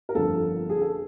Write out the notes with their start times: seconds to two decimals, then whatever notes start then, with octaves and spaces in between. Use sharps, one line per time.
0.09 A#4
0.15 G1 F2 D3 A4
0.70 G#4
0.81 A4